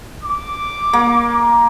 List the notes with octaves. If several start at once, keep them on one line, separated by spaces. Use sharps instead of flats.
D6
A#3